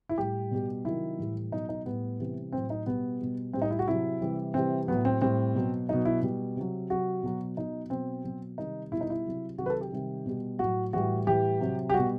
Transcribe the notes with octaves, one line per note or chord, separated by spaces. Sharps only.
E4
A2 G3 G4
B2 G3
C3 D#3 F#3 E4
A2 E3 G3
B2 F#3 D#4
D#4
A2 G3 B3
C3 E3 G3
A2 F#3 C4
D#4
B2 G3 B3
B2 G3
A2 G3 C4
D#4
E4
F#4
C3 F#3 E4
C3 E3 G3
C3 E3 G3 C4
A2 F#3 B3
C4
A2 G3 C4
B2 F#3
B2 F#3 D#4
E4
B2 G3
C3 F#3
C3 F#3 F#4
B2 F#3
B2 F#3 D#4
B2 F#3 C4
B2 F#3
C3 D#3 G3 D#4
B2 G3 E4
D#4
E4
C3 F#3
C3 D#3 F#3 F#4
B4
A4
G4
C3 D#3 G3
B2 G3
A2 F#3 F#4
A2 E3 G3 F#4
A2 E3 G3 G4
C3 F#3
G4
B2 G3 F#4